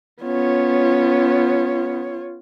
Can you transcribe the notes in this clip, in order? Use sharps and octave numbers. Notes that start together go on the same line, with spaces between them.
B3 C#4 F4 C#5